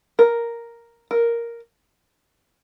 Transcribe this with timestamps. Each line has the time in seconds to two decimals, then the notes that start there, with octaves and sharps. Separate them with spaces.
0.19 A#4
1.11 A#4